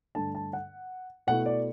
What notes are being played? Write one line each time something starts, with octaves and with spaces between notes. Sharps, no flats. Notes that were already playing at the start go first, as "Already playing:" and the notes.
G2 D3 A3 D4 A5
A5
F#5
B2 A3 E4 F#5
D5